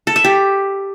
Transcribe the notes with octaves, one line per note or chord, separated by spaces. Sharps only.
A4
E5
G4